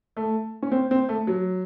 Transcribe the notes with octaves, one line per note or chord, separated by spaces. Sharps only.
A3
C#4
C4
C4
A3
F#3